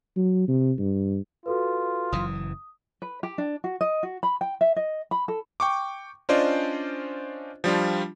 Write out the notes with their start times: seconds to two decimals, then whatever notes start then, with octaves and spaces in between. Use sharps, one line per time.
0.17 F#3
0.48 C3
0.78 G2
1.46 F4 F#4 A4 B4
2.12 F#1 F#2 E3 D#6
3.02 B4
3.23 G4
3.38 D4
3.64 F#4
3.81 D#5
4.03 F#4
4.23 B5
4.41 G5
4.61 E5
4.76 D#5
5.11 B5
5.28 A4
5.60 G5 C#6 D6
6.29 C#4 D4 F4 C5 D5 D#5
7.64 F3 G3 D4 F4